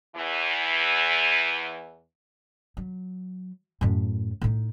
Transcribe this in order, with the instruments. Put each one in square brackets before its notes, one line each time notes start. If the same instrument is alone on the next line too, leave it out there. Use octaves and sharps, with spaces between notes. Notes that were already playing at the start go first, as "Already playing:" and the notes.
[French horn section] E2 E3
[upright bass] F#3
F#2 A2
A2 D#4